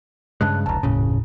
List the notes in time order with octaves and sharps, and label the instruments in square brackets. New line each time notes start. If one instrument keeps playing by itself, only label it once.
[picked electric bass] G2 C#3 G#3 [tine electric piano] A5 F#6
[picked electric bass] F1 C#2 [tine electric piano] A5 A#5
[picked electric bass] F#1 C#3 [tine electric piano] D#2 A2